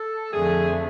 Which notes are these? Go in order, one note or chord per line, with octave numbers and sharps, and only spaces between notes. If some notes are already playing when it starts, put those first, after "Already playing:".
Already playing: A4
F2 D3 A3 G#4